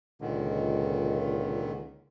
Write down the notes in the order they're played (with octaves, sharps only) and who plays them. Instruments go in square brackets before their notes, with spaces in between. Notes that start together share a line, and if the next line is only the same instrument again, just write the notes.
[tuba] C#2 [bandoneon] A#2 D3 D#3